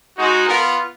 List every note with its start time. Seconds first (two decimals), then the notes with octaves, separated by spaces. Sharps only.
0.18 G#3 D#4 F#4
0.47 B3 F4 A#4